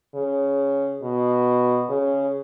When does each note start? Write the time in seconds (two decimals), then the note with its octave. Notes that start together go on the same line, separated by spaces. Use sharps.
0.15 C#3
1.02 B2
1.89 C#3